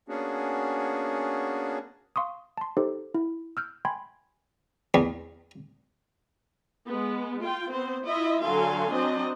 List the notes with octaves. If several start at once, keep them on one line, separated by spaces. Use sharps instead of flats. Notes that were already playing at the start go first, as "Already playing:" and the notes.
A#3 B3 C#4 D4 F#4 G#4
F5 C6 C#6 D#6
A5 C6
D#4 G4 A4 C5
E4
E6 F6 G6
G5 G#5 B5 C6 G#6
E2
G#3 B3
F4 G5
B3 C4 C5
E4 F4 D#5 E5
D3 F#3 A4 F5 G#5 C6
F#3 C4 D4 D#5